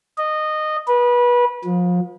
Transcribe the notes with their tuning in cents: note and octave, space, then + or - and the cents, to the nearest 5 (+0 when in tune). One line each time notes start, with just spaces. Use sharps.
D#5 -15
B4 -25
F3 +35